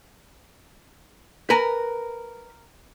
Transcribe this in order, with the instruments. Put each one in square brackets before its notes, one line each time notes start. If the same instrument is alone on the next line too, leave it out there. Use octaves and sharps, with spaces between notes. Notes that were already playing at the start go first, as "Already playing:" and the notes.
[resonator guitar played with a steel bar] A#4 [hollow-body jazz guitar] B4 G#5 A#5